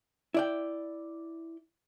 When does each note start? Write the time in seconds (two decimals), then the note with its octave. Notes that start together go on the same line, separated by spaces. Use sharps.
0.34 E4 D5 G5